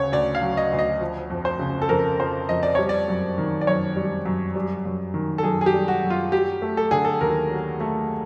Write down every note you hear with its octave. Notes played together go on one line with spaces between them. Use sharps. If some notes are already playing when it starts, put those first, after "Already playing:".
Already playing: D2 C#3 C#5
D2 D5
F5
F#3
D#5
D2
D#5
F3
F2
C5
C#3
A4
F2 A#4
F3 C5
F2 D#5
D5
G3 C#5
D5
F#2
D#3
D5
F#2 C#5
G3
F#2
G3
F#2
D#3
A4
F#2 G#4
G#4
G4
G3
F#4
F#2
F4
F#3 G4
A3
A4
D3 G#4
A4
D#2 A#4
F#3
A3